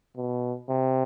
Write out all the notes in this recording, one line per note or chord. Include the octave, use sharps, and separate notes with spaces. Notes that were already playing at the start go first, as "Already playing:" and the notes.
B2
C3